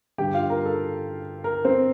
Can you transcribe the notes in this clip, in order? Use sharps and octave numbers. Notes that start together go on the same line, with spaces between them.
G2 D3 G4 G5
F4 F5
A#4
A4
A#4
C4 C5